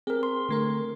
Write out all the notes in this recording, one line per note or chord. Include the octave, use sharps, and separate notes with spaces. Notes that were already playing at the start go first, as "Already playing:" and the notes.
C4 G#4 A#4
C6
D3 A3 A#4